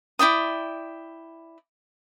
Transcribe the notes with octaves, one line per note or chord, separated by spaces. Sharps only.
E4 D5 G5 D#6